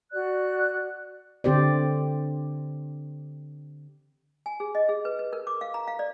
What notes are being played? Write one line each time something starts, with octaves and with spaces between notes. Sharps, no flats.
F#4 D5 F#6
D3 C4 G4 C5 D5
G#5
G#4
D#5
G#4
B4
B4
A#4
D6
F5
A#5
F5
D5